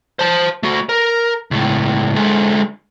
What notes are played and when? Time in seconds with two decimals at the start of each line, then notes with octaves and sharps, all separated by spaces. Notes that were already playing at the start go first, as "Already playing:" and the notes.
0.19 C5 A5
0.63 A3 F#4
0.89 A#4
1.51 C#2 A2
2.17 D3 G#3